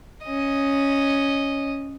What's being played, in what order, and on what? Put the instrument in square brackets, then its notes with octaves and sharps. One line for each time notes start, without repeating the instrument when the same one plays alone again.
[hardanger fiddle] C#4 D#5